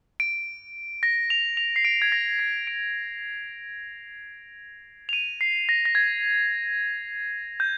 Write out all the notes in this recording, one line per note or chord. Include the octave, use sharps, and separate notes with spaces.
D7
A#6
F7
F7
C7
D7
G#6
A#6
C7
D7
F7
D#7
C7
A#6
A#6
G#6
G6